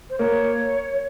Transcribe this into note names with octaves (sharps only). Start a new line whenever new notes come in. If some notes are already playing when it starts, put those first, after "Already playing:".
C5
A#3 C#5